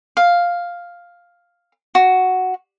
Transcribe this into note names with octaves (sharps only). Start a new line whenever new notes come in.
F5
F#4